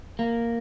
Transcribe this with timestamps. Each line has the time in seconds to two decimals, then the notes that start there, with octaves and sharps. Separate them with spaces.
0.19 A#3